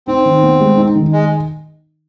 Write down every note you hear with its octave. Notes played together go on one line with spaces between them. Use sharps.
C4 D#4
D#3
B3
G#3
D#4
D#3
G#3